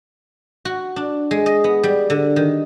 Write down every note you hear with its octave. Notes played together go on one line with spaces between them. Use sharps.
F#4
D4
G#3
D#5
B3
G3
D3
D#3